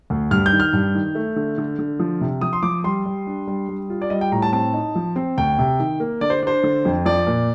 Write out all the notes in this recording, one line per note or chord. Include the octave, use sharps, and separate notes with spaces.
D2
G2 F6
G6
D#3
F6
G2
D#3
A3
D3
D3
D3
F3
C3
F3 D#6
C6
F3 D6
G3 C6
G3
D4
G3
G3
F4
D5
G3 D#5
G5
A2 A#5
A5
C4 A5
D#4
F3
C4
D2 G5
C3
D#3
A#3
D3 D5
C5
D4 C5
D3
F2
F3 D5
A#2